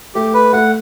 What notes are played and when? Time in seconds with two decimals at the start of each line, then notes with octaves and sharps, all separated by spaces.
0.15 A3 G4
0.34 B4
0.53 A3 F#5